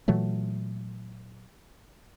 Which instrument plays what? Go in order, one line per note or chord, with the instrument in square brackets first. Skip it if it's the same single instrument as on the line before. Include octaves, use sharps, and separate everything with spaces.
[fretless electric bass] A#2 E3 F#3 A3